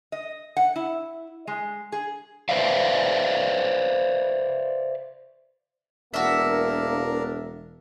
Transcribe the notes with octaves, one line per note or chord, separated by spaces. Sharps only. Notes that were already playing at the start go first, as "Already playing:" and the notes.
D#5
F#5
E4
G#3
G#4
B4 C5 D5 E5 F5
E1 A#3 D4 F#4 A#4 E5